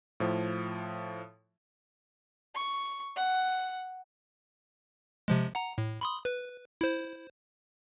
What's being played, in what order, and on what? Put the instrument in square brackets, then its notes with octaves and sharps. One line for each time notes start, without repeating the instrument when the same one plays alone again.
[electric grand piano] A2 F3
[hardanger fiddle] C#6
F#5
[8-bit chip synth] C3 F3 G#3
F#5 A#5
A2
B5 C6 D#6
B4
E4 C5